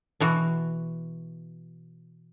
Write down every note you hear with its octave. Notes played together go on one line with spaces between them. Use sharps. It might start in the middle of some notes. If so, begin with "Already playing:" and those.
B2 E3 F#4